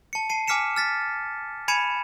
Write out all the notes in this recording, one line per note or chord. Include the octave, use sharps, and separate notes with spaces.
A5 C#7
A5 C7 D#7
G#5 D6 F6 B6 C#7 E7
F6 A6 B6
G#5 B5 G#6 C#7 D#7 E7